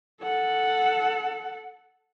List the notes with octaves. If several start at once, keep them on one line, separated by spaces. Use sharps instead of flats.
A4 F#5